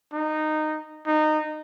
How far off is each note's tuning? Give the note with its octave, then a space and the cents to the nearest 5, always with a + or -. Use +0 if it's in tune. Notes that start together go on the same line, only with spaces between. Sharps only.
D#4 -15
D#4 -20